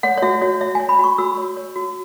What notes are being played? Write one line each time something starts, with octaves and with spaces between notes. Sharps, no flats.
C#5 F#5
C#5
F#4 E5
F#4 C#5
C#5 E5
C#5 G#5
B5
F#4 C#6
F#4 E6
C#5
C#5
F#4